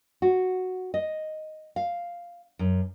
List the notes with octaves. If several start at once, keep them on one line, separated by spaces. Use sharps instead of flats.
F#4
D#5
F5
F#2